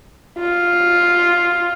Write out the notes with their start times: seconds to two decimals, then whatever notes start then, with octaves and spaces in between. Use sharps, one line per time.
0.39 F4